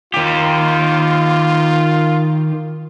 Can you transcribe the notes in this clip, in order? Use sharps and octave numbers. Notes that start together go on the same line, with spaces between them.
D#3 F4 G4